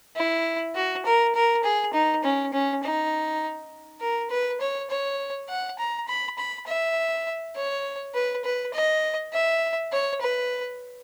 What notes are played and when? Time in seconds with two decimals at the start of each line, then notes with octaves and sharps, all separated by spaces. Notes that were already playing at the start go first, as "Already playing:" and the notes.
0.16 E4
0.75 F#4
1.06 A#4
1.35 A#4
1.64 G#4
1.93 D#4
2.24 C#4
2.53 C#4
2.83 D#4
4.01 A#4
4.30 B4
4.61 C#5
4.90 C#5
5.49 F#5
5.78 A#5
6.08 B5
6.38 B5
6.66 E5
7.56 C#5
8.14 B4
8.44 B4
8.74 D#5
9.33 E5
9.93 C#5
10.21 B4